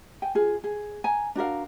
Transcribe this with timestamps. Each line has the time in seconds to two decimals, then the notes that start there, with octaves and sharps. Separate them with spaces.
0.22 G5 G#5
0.35 F4 G#4
0.64 G#4
1.04 G#5 A#5
1.35 D4 F#4 A#4 F5